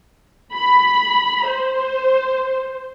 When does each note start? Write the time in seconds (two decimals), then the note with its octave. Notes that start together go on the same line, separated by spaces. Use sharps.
0.53 B5
1.48 C5